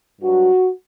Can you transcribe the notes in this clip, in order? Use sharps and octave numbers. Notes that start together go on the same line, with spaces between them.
G2 F#3 F#4